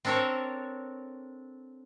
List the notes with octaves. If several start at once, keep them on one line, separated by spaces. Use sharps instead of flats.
C4 D4 A4 A#4 C#5